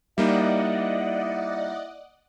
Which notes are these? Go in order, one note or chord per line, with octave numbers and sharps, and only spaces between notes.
G3 A#3 D#4 E4 D5 D#5 F#5